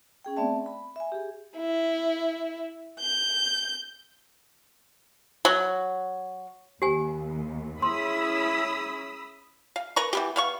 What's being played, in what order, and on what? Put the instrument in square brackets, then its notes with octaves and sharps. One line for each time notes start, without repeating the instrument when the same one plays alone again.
[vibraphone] C#4 G#4 G5
A3 B3 C4 D5 E5 A5
B5
E5 G#5
G4 G#4
[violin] E4
G6
[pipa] F#3
[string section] D#2 [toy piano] G4 G#5
[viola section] C#4 E4 G#4 [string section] B5 D#6 E6 [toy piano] C6
[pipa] F5
A#4 B4 A#5 C#6
E3 B3 G4
B3 F5 C#6